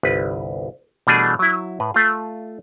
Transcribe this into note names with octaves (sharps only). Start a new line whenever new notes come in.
G1 C2 B4
B2 E3 G3 A3 D4 G#4
F#3 E4
A2 B4
A3 F4